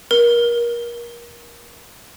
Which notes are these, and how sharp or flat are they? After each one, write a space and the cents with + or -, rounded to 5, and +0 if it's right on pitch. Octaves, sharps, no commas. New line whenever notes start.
A#4 +25